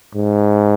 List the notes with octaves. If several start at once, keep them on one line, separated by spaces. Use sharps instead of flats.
G#2